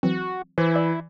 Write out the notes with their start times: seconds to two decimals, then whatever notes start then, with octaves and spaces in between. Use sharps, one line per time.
0.03 E3 F#3 C4 F#4
0.58 E3 E4 C5
0.76 D5